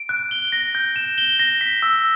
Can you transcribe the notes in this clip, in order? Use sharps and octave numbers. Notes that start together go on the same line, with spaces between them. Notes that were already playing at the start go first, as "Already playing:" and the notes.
Already playing: D7
F#6
G7
A#6
G6
E7
G7
A#6
B6
E6